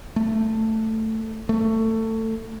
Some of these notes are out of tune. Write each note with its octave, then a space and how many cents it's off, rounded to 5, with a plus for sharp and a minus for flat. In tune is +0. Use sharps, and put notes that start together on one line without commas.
A3 +10
A3 +20